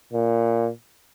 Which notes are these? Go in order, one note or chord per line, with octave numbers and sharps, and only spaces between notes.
A#2